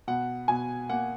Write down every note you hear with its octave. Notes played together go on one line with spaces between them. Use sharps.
B2 F#5
B2 G#5
A#3 F#5